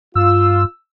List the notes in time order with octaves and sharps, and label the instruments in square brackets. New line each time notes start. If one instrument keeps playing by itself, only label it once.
[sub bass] G2 [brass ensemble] F4 [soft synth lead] E6